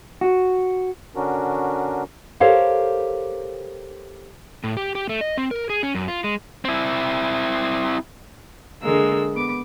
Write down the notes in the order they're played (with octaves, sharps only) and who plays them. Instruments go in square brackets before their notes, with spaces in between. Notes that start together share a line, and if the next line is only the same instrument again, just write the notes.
[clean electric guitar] F#4
[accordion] D3 C#4 D4 F#4 A#4
[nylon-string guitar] G4 A4 A#4 C5 C#5 F5
[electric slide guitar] A2
G4
G4
A3
D#5
C4
A#4
G#4
C#4
F#2
F4
G#3
[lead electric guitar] C4 E4
[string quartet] D3 G#3 A#3 E6
B3 D6